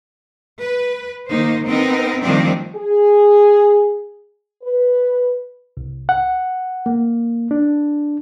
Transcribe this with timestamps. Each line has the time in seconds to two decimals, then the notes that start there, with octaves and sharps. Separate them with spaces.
0.62 B4
1.29 D#3 A#3 D#4 C5
1.66 B3 C4 D#4 A#4
2.22 D#3 F3 G3 A3 C4 D4
2.75 G#4
4.63 B4
5.77 C2
6.09 F#5
6.86 A#3
7.51 D4